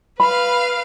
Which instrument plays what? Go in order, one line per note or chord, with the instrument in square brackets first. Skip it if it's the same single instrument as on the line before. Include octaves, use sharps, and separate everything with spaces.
[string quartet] B4 F5 [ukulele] B5